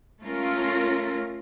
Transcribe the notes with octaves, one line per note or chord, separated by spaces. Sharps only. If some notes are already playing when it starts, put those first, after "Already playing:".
A3 C#4 F4 A#4